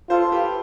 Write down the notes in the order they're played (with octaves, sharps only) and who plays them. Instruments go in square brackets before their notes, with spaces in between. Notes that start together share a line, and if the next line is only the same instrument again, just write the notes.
[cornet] F4 [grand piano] A4 C5
[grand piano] G4 B4